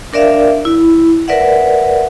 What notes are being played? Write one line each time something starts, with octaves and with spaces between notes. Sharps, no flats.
D4 A#4 D5 E5 F5
E4
A#4 B4 D5 E5 F#5